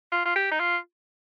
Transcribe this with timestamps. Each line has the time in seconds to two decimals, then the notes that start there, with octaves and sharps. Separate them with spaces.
0.12 F4
0.25 F4
0.36 G4
0.51 D#4
0.60 F4